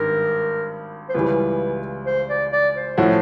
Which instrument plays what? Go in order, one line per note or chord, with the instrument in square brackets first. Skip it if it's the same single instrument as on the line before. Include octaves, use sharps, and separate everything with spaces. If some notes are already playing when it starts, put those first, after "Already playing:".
Already playing: [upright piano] G#1 G2 D#3 G3 [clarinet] A#4
[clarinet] C5
[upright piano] C#2 C#3 E3 G3 [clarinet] B4
[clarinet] C5
D5
D5
C5
[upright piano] A2 F3 A3 C#4 F#4